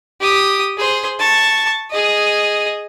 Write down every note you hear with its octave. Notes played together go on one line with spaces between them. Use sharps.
G4 D#6
G#4 C5
A5 C#6
G#4 D#5